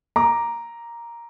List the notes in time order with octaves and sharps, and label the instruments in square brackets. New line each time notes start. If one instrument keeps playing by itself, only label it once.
[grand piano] A#5 D6